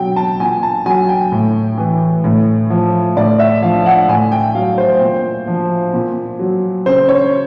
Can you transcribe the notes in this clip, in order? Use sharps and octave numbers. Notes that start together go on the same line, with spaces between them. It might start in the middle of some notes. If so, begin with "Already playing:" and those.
Already playing: B2 F#3 G5
A5
A#2 G#5
A5
F#3 G#5
G5
A2
E3
A2
F3
A2 D5
E5
F3 F5
F#5
A2 G#5
G5
F#3 F5
C5
A#2
F3
A#2
F#3
C#3 C5
C#5